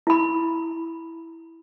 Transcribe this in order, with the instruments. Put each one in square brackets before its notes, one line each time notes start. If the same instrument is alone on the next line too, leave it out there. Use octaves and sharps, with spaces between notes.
[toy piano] E4 B5